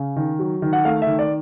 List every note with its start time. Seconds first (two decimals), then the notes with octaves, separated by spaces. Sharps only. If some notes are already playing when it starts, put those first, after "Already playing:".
Already playing: C#3
0.16 D#3
0.39 F#3
0.62 D#3
0.73 F#5
0.85 A3 F5
1.02 D#3 E5
1.19 D5